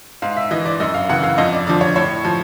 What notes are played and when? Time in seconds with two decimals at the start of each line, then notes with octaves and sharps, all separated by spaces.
0.22 G#2 F5
0.37 E5
0.51 E3 D#5
0.66 D5
0.80 F#2 D#5
0.94 F5
1.09 C#3 E3 F#5
1.24 F5
1.38 F2 D#5
1.52 D5
1.67 D3 F3 D5
1.81 C#5
1.96 A2 C#5
2.25 F3